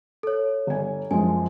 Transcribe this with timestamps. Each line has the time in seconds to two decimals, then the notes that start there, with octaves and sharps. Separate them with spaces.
0.23 A4 C#5
0.67 G1 G#5
1.11 F#2 F3 G#3 G#5